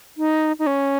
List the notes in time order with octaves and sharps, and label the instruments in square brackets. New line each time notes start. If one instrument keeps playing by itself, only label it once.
[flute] D#4
D#4
C#4